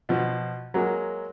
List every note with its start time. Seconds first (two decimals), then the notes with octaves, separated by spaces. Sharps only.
0.09 B2 F3
0.74 F#3 G#3 A#3